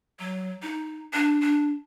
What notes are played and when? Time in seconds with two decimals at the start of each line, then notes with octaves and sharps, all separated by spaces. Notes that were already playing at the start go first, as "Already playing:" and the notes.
0.19 F#3
0.62 D#4
1.13 D4
1.41 D4